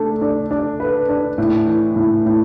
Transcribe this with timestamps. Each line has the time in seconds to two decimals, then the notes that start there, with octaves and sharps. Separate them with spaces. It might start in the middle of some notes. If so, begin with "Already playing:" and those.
Already playing: A3 D4
0.21 D4
0.51 D4
0.80 B4
1.09 D4
1.38 A2
1.67 E3
1.96 A2
2.26 A2